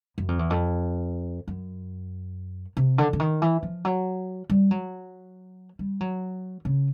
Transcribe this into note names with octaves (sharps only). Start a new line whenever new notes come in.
F#2
F2
E2
F2
F#2
C3
D3
D3
D#3
E3
F3
F#3
G3
F#3
G3
F#3
C#3